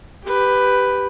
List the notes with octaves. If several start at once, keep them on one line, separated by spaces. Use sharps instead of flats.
G4 B4